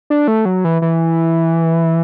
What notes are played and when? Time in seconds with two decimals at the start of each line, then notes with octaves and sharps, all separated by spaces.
0.10 D4
0.28 A3
0.45 F#3
0.64 E3
0.82 E3